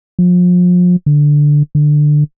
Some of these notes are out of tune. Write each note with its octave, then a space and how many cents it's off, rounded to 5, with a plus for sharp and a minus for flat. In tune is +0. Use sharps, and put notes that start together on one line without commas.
F3 +35
D3 +0
D3 +15